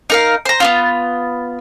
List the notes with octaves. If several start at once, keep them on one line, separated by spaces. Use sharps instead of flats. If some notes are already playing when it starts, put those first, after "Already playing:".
D#4 A#4 F5
C5 A#5
B3 C4 F4